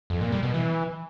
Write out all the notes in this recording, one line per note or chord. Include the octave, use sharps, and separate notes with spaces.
F2
A#2
G3
B2
E3